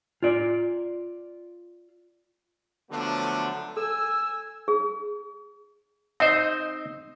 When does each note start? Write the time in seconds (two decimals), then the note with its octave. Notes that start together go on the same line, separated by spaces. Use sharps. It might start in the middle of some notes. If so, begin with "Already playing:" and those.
0.23 F4 D5
2.91 D3 F3 F#3 A3 B3 D4
3.77 A4 G#5 E6
4.68 G#4
6.20 C4 D#4 C5 D#5